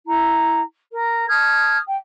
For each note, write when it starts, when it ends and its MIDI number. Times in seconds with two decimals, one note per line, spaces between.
0.06 0.60 64
0.06 0.60 82
0.91 1.27 70
1.28 1.78 81
1.28 1.78 87
1.28 1.78 89
1.28 1.78 92
1.86 1.96 79